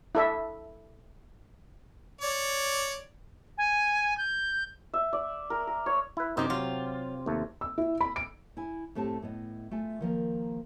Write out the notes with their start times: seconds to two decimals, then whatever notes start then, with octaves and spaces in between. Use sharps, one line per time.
0.15 E4 A4 E5
2.21 C#5 D5
3.58 G#5
4.17 G6
4.94 E5
5.13 D5
5.50 A#4
5.67 A#4
5.86 C#5
6.17 E4 B4
6.37 F#2 C3 C4 D#4 G4
6.50 F#3 F4
7.26 D#2 A3
7.61 E6
7.78 E4
8.01 B5
8.16 D7
8.57 E4 G#5
8.95 A2 A3 C4 G4 A5
9.22 A2 B3 D#5
9.71 A3 F4 E5 G#5
10.01 D#3 F3 A#3